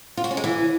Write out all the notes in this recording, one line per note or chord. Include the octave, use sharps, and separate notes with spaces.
F4
F#4
C#4
G#3
E3